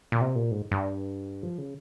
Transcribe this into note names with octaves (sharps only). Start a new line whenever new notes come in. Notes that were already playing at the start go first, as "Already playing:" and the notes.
A#2
C3
A#2
G#2
G2
F3
C#3